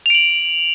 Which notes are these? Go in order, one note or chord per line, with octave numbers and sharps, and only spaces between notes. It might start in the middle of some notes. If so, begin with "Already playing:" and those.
D7 F7 F#7